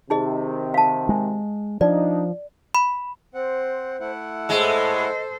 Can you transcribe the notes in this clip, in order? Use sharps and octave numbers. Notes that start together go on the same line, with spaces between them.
C3 D#3 D#4 G#4 D#5
F5 A5
G#3
F3 D4 D#4 D5
B5
C4 C5 F#5
A3 E4 F#5
A2 G#3 A4 C5 D#5